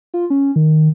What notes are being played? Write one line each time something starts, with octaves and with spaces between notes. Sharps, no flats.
F4
C#4
D#3